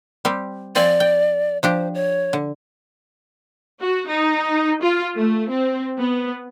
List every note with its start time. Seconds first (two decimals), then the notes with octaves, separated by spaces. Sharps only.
0.25 G3 C4 G4
0.75 F3 C4 D5 G#5
1.00 G5
1.63 F3 D4 G4 C5
1.95 C#5
2.33 D3
3.80 F#4
4.08 D#4
4.82 F4
5.15 A3
5.50 C4
5.97 B3